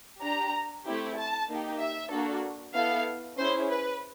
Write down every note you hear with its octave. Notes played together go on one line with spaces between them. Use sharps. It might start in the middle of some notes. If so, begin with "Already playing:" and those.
D4 G4 A#5
A3 C4 E4 G4
A5
A#3 D#4 G4
E5
A#3 D4 F#4 A4
B3 E4 A4 F5
C#4 E4 G#4 C5
B4